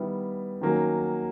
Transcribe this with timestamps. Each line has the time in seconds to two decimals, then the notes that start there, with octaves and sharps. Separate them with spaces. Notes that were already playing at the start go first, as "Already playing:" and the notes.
Already playing: D#3 G3 B3 E4
0.61 D#3 F#3 A#3 C#4